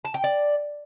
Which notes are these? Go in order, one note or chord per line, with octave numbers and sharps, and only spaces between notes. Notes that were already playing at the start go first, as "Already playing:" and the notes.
A5
G5
D5